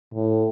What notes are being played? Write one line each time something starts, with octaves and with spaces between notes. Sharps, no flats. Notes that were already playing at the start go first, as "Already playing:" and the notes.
A2